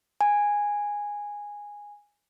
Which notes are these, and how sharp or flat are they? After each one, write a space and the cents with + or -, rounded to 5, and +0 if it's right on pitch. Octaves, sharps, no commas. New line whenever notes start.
G#5 -10